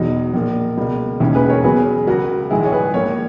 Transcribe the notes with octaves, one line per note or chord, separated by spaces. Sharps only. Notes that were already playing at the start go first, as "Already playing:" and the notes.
Already playing: E1 E2 B2 F#3 D#4
A#1 A#2 A#3
C#2 B2 A#3
E1 D#2 D#3 C#4 E4
G#4 B4
A#4 C#5
E2 C#3 F#3 B3 G#4 B4
C#2 C#3 F#3 F#4 A#4
A#1 G#2 D#3 G#3 E4 G#4
C#5
G#4 B4
A#1 A#2 A#3 A#4 C#5